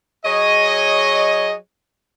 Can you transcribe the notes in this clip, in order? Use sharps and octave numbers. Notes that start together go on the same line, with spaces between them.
F#3 G#4 C#5 D#5